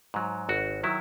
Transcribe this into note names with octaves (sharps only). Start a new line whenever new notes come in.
G#2 F#3
G#1 F#4
D#3 F#3 E4